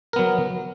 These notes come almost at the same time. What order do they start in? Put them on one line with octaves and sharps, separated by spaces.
A#4 B3 F#3